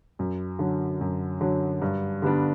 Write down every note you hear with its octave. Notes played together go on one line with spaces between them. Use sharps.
F#2
D3 F#3
F#2
D3 F#3
G2
D3 G3 B3 D4